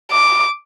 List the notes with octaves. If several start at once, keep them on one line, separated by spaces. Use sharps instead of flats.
D6